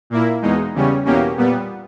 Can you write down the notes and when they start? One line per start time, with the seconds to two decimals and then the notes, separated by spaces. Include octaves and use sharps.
0.10 A#2 A#3 E4
0.42 E2 B2 G#3 D#4
0.74 E2 C#3 G3 C#4
1.05 E2 B2 A#3 C#4 G4
1.37 A#2 G3 B3